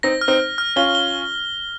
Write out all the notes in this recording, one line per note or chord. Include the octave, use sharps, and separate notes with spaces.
C4 D#4 A#6
F6
C4 D#4
F6
F6
C#4 F4 G7
G7